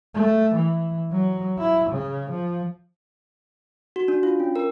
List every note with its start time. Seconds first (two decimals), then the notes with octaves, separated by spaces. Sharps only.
0.14 A3
0.55 E3
1.11 F#3
1.58 E4
1.90 C#3
2.31 F3
3.96 F#4
4.08 D4
4.23 F4
4.40 C#4
4.56 A#4